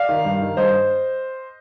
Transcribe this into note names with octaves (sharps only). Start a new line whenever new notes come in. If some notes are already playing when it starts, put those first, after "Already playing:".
Already playing: D5 F5
D#3
G2
D#3
G2 C5 D#5